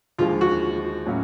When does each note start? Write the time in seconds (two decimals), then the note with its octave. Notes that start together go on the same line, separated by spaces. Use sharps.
0.19 D#2 D3 F3 G#3 F4
0.41 F#4
1.06 A2 F#3 A#3 C#4